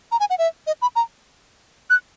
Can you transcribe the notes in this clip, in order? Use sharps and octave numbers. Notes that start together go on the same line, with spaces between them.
A#5
G#5
F#5
E5
D#5
B5
A#5
F#6